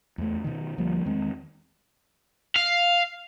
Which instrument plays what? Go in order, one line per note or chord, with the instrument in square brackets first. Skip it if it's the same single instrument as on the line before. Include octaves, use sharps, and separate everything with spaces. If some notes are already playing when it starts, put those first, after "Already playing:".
[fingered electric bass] E2 A3
B2 D#3
D2 F3 G3 A#3
E2 D#3 G#3 C4
[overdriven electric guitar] F5